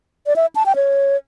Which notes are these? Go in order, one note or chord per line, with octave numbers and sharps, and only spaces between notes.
D5
E5
A5
G5
C#5